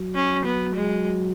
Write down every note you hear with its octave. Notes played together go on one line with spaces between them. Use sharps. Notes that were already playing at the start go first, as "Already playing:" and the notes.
Already playing: F#3
C#4
B3
G#3